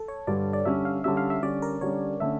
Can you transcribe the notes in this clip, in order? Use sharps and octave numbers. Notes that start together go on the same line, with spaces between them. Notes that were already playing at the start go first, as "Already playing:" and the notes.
Already playing: A4
C#5
G2 D3 G3 D5
D5
D3 G3 C#4 E5
F5
D3 G3 C#4 E5
F5
E5
D3 G3 C#4 D5
A#4
D3 G3 C#4 C#5
D3 A3 C#4 E5